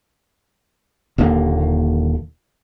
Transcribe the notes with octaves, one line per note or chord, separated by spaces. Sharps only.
D#1 D#2 D3 A#3